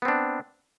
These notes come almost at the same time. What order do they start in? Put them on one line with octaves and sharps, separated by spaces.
B3 C4 D4